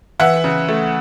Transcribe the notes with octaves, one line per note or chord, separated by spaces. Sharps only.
E3 E5 F#5
C#3
A3